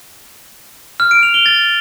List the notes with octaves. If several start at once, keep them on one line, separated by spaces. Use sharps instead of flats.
F6
D7
F7
G7
A6